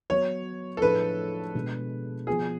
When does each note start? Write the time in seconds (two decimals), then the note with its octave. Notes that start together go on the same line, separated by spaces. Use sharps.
0.10 F#3 B3 F#4 C#5
0.77 A4
0.82 A2 F3 A3 D4 G#4 B4
1.55 B2 G#3 D4 G#4
2.27 F3 B3 F4 G#4 B4